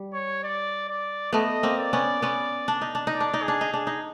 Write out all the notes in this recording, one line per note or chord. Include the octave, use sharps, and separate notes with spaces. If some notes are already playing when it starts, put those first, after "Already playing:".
Already playing: G3
C#5
D5
D5
A3 B3 D#5
A#3 C4
D5
B3 C#4
B3 C#4
D4
D#4
D4
D#4
D5
D4
D#4
G#4
D4
D#4
D4 G#4
D#4